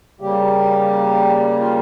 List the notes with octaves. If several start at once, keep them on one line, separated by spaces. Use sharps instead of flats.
C#3 G3 A#3 G4
F4